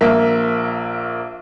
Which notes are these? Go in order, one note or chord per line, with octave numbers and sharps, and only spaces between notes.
A#1 A#3 E5